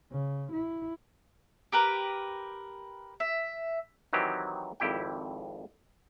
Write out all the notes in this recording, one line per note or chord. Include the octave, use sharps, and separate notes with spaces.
C#3
E4
G4 A#4 B4
E5
D#3 E3 F#3 C4 D#4 G4
G#1 F2 E4 G4 G5